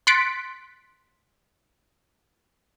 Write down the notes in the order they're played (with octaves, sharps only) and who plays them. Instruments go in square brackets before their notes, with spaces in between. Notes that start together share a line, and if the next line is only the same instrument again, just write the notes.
[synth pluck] C6 F#6 A6 B6 C#7 D7